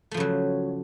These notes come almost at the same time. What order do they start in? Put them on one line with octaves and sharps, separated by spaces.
A3 F3 C#3 F#3